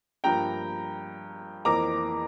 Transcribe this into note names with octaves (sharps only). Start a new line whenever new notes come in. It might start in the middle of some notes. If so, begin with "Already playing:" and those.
G2 F3 A#3 G5 A#5
F2 E3 A#3 A#5 D6